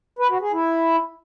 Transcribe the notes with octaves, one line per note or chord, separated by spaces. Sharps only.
B4
F#4
G#4
E4